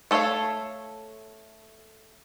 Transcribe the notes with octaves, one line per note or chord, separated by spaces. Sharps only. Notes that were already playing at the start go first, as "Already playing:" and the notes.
A3 A4 C#5 E5 F5